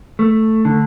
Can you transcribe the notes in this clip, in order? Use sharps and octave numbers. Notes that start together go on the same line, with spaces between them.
A3
D3